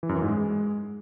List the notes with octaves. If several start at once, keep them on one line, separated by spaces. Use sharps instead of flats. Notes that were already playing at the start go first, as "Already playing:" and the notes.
E3
F#2
E3
G#2
G#3